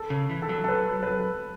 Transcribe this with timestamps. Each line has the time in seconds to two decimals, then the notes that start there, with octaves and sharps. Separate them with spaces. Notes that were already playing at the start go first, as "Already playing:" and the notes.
Already playing: A4
0.10 C#3
0.30 E3
0.42 A4
0.49 F#3
0.64 A4
0.68 B4
1.03 B4
1.07 A4